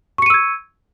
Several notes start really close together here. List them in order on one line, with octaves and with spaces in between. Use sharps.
C#6 C#7 D#7 E6 G#6